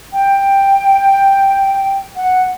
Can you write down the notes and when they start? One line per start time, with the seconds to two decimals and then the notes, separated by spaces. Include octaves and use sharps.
0.13 G5
2.16 F#5